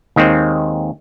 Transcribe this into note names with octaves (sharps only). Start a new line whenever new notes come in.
D#2 D#3 G#3 C4